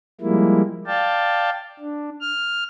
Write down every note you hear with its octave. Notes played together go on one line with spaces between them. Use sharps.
F3 G3 G#3 A#3 E4
D5 F5 G5 A5
D4
F6